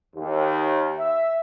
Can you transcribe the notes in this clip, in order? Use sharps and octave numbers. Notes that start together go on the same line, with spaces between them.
D#2
E5